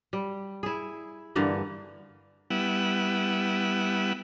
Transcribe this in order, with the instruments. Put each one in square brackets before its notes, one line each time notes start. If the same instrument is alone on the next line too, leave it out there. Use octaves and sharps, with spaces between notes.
[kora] G3
E4 G#4
G2 D3 E3 A#3
[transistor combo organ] G3 B3 E4 F#5